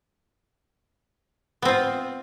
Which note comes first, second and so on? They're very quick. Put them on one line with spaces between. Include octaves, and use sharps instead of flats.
B3 C4 F4